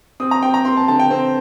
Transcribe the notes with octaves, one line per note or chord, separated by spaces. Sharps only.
C4 D#6
A#5
C4 G5
A#5
C4 C6
A5
D3 A5
G5
C4 C5